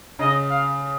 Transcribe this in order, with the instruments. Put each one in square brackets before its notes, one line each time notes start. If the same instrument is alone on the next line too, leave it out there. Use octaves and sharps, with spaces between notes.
[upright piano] C#3 [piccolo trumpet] D#5
[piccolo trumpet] F5